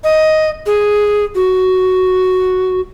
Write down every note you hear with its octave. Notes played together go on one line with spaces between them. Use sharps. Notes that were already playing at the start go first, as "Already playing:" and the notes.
D#5
G#4
F#4